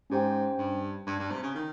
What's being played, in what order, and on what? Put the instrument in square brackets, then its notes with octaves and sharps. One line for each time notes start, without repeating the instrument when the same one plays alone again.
[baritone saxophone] G#2 [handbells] C#4 G4 C5 G5
[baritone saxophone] G2
G2
G2
C3
C#3
D#3